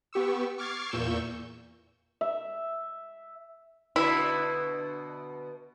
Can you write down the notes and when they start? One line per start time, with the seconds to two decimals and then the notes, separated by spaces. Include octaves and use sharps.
0.13 B3 G4 C#6 E6
0.58 C#6 D6 F6 G#6 A6 C7
0.91 E2 A#2 C#6 E6 G6 E7
2.21 E5
3.96 B2 D3 B3 E4